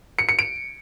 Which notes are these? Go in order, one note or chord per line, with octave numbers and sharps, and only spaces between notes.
C#7
C#7
D7